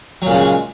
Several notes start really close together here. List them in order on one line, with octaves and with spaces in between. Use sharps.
F#3 A#2 C#3 G#3